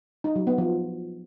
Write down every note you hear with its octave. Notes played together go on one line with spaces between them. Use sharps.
D#4
F#3
B3
F3